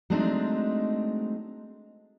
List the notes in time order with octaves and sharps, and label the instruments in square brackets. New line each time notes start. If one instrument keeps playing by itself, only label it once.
[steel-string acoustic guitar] F#3 G#3 A3 C4 D4 D#4